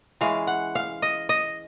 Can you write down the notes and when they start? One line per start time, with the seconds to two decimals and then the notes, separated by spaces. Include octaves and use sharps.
0.21 E3 G#3 C#4 F5
0.47 F#5
0.75 F5
1.02 D#5
1.29 D#5